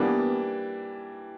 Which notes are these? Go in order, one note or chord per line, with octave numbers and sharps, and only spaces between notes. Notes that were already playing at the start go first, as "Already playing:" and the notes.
Already playing: E3 G3 A#3 B3 D4